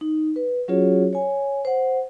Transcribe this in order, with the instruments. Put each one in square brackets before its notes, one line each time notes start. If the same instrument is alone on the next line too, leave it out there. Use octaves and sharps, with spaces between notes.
[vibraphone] D#4
B4
F#3 C#4 F4 F#4 G#4 C#5
C#5 G#5
C5 F#5